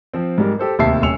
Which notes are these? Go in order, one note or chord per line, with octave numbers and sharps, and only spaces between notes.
F3 C4
G#2 G3 A#4
G4 A4 C5
D1 D#2 C3 E5 A5 C7
D#1 C#4 E6 C#7 F7